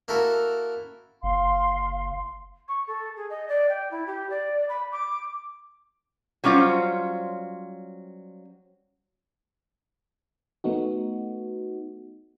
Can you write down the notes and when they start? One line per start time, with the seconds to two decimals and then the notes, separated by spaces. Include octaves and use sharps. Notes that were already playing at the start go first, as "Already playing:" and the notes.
0.08 A#3 E4 F#4 A4 A#4
1.23 F#1 F5 C6
2.68 C#6
2.88 A4
3.17 G#4
3.30 D#5
3.49 D5
3.69 G5
3.91 E4
4.07 G4
4.30 D5
4.69 B5
4.92 D6
6.44 F#3 G3 C#4 F4 C5
10.64 A3 B3 D#4 F#4